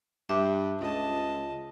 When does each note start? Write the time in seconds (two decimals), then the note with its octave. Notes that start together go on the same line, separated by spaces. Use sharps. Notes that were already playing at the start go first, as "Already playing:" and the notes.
0.29 G2 E5 D6
0.81 C#2 D#5 A5